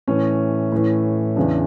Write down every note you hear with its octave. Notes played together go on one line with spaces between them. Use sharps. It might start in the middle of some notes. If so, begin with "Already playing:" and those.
A2 E3 C#4
A2 E3
E2 C#3 E3 D4